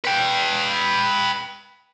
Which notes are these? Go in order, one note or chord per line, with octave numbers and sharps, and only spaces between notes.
B4 G5